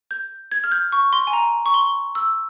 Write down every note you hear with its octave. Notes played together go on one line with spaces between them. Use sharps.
G6
G#6
F6
G6
C#6
C6
G#5
A#5
C#6
C6
E6